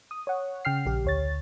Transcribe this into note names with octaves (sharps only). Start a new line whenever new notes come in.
D#6
C#5 F#5
C#3 G5 F6 C7
A#1 G4
D2 C#5 A6